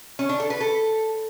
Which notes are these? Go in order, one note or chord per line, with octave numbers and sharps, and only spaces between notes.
C#4
D4
A4
B4
A4